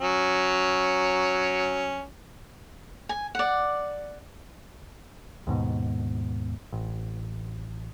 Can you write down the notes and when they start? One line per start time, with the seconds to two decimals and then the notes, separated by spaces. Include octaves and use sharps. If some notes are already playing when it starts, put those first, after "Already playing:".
0.01 F#3 C#4
3.09 G#5
3.35 D5 F#5
5.47 D#2 G#2 B2
6.73 A1